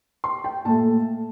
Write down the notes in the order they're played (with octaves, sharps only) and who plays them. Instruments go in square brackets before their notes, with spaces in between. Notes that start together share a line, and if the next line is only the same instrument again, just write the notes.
[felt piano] C6
G5
A#2 A3 A5